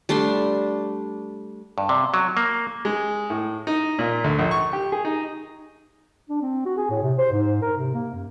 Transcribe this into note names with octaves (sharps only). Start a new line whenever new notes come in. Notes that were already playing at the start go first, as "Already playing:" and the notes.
G3 A3 D4 C6
G2
C3
F#3
A#3
G#3
A2
D#4
A#2
D2
A#1
C#6
G4
G#4
D#4
D4
C4
F#4
G#4
A2
C3
C5
G#2
A#4
C3
A#3
F#2